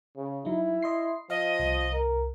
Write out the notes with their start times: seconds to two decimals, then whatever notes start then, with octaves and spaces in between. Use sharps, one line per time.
0.16 C#3
0.45 F#3 D#4 E4
0.83 D#5 C6 C7
1.30 F3 D#5 F5
1.59 C2
1.93 A#4